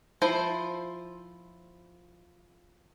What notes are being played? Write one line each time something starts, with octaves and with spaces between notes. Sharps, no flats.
F3 E4 C5